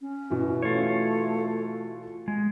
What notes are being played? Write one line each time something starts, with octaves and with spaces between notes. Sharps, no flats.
C#4
B2 E3
A3 F4 C#5
G#3